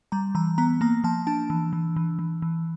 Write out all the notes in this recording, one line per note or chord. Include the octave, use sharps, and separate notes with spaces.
G3 A#5
E3 A#5
B3 A#5
A#3 A#5
F3 A5
D4 A5
E3
E3
E3
E3
E3